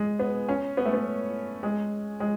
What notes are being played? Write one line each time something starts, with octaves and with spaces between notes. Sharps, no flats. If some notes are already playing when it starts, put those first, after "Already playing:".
Already playing: G#3
B3
C#4
B3
A3
B3
G#3
G#3